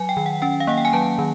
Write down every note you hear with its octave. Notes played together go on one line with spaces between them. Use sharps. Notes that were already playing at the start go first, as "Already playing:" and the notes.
Already playing: F#3 G#5
G5
D#3
F#5
C#4 G5
F5
A#3 F#5
G5
G#5
F#3 A5
D#3